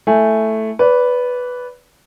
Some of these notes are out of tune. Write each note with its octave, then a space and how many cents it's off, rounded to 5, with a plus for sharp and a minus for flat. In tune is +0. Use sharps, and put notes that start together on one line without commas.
A3 +0 E4 +0 G#5 +0
B4 +0 D5 -30